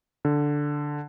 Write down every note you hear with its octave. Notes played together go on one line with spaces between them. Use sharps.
D3